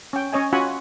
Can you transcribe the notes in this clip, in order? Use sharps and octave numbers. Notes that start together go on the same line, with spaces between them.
C#4 G5
C#4 C#5 D#5 G#5
C#4 F4 F#4 F#5 G#5 B5